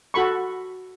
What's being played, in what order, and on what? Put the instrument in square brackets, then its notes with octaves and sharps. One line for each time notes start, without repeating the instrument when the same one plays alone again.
[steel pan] F#4 A4 B5 C#6